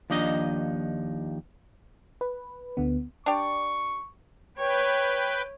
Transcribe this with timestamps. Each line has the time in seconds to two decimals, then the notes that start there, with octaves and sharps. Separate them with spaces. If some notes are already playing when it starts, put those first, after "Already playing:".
0.10 D#2 F3 D4 D#4 D#5
2.21 B4
2.77 D2 D3 B3
3.26 D4 G4 D5 C#6
4.57 B4 C#5 G5